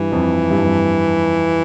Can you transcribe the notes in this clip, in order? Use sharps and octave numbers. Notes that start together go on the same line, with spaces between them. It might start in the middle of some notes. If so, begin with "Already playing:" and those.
Already playing: G2 E3
F2
G2
F2
G2